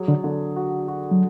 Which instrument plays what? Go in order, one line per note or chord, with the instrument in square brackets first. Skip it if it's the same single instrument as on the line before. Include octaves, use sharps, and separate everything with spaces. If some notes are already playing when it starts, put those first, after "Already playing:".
Already playing: [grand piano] F#3 G#4
[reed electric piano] D3
[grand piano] D3
F#4
F#4
[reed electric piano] F#3